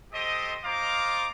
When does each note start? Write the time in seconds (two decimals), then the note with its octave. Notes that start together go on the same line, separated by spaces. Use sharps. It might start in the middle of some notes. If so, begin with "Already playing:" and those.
0.14 G4 A4 C5 D#5
0.65 F4 C5 D#5 F5 A#5 D6